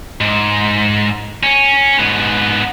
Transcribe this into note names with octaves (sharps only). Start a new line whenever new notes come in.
G#2
C#4
G#2 B3